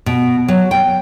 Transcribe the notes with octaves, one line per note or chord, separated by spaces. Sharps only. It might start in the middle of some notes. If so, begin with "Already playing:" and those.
B2
F#3
G5